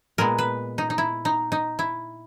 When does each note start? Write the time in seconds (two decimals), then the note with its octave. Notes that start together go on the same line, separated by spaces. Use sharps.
0.18 A#2 G#3 B3 A#4
0.38 B4
0.78 D#4
0.90 D#4
0.98 E4
1.25 D#4
1.52 D#4
1.79 E4